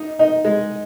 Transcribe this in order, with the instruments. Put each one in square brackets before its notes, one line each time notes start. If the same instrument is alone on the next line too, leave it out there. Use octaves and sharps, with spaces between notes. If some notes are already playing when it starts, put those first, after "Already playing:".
Already playing: [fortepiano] D#4
D#4
G#3